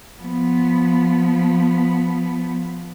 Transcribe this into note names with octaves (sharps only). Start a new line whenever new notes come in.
F3 B3